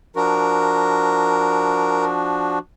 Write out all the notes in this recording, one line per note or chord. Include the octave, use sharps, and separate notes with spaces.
F3 D4 F#4 A#4